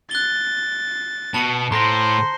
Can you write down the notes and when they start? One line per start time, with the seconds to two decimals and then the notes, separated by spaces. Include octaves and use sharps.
0.11 F#6 A6 G7
1.34 B2 A5 C#7
1.72 A2 C5 A#5 C6 A#6